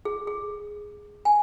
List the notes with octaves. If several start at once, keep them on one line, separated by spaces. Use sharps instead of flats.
G#4
G#4
G#5